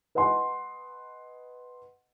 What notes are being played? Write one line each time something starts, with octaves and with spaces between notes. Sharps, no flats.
B4 D#5 F#5 G#5 C6